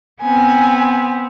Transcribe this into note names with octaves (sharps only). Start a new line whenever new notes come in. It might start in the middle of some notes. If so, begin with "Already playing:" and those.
B3 C4 G#5